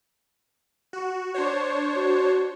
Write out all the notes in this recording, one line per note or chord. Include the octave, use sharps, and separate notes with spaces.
F#4
D4 C5 C#5
F#4